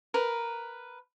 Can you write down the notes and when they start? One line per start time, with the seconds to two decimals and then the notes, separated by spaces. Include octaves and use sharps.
0.14 A#4 B4